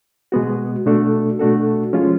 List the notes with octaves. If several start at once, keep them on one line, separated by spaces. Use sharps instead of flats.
B2 G#3 B3 F#4
B2 A3 D4 F#4 A4
B2 A3 D4 F#4 A4
F3 G#3 C#4 F4